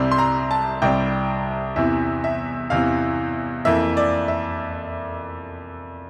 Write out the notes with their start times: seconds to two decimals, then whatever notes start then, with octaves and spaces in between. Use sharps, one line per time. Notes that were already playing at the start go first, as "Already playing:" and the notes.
Already playing: C2 C3 G3 C6
0.12 C6
0.18 A#5
0.51 A5
0.82 C2 C3 G3 G5
1.76 E2 C3 E3 E5
2.24 E5
2.70 E2 C3 E3 F5
3.65 F2 E3 A#3 E5
3.97 D5
4.28 E5